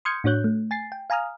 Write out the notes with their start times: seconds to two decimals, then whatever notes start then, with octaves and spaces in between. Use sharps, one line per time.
0.05 C6 D#6 F6 G6 G#6 C#7
0.24 A2 D4 F#4 C#5 F#6 G6
0.44 A3
0.71 G#5 A6 C7
0.92 G5
1.10 F5 G#5 A#5 D#6 F6